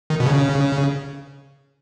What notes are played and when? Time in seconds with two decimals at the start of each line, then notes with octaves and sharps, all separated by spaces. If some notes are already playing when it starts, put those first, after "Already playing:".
0.10 D#3
0.20 B2
0.27 C#3